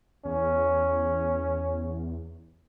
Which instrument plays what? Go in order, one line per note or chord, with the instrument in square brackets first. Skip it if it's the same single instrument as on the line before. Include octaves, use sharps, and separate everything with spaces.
[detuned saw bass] E2 [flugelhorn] C#4